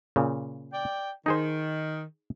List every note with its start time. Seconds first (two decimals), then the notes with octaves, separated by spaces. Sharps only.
0.16 A#2 C#3
0.72 D5 G5
1.26 D#3 D#4 G#4 C5